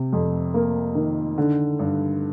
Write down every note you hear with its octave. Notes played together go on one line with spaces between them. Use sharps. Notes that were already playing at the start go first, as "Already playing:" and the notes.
Already playing: C3
F2
A#3
D#3
D3
G2